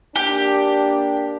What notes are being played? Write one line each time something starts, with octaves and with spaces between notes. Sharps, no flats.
A#3 D4 G4